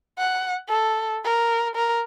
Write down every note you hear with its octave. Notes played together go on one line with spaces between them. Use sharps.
F#5
A4
A#4
A#4